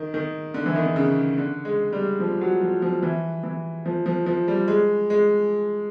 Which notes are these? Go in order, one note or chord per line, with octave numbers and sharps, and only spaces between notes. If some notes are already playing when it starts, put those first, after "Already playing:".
Already playing: D#3
D#3
D3
E3
D#3
D3
C#3
D3
G#3
G3
F3
F#3
F3
F3
E3
E3
F3
F3
F3
G3
G#3
G#3